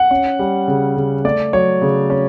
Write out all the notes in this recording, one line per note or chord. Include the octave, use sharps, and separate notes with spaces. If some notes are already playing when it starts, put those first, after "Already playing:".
Already playing: F#5
C#4
G3
C#3
C#3
A3 D5
F#3 C#5
C#3
C#4